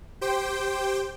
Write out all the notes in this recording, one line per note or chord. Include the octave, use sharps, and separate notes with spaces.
G4 C5 G5